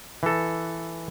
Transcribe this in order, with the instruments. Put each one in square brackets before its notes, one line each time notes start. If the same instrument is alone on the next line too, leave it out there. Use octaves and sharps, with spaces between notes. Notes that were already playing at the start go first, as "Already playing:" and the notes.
[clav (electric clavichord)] E3 A4